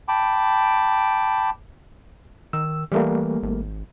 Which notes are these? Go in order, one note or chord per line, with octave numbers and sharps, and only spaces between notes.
G5 A5 B5 D6
D#3 E6
E3 G3 A3 A#3
G#1